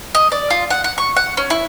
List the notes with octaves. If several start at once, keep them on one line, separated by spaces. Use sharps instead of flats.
D#5
D5
F4
F#5
F#5
C#6
F#5
C#4
E4